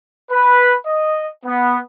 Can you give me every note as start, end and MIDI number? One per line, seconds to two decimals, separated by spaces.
0.31 0.75 71
0.86 1.27 75
1.46 1.80 59